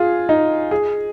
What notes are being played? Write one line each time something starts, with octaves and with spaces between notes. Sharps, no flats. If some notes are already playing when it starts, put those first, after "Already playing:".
Already playing: F4 G#4
D#4
G#4